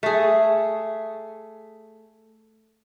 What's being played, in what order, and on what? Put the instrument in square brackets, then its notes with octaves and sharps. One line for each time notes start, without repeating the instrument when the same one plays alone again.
[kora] A3 G#4